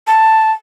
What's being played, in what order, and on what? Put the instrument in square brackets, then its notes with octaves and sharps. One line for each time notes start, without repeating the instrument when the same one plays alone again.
[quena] A5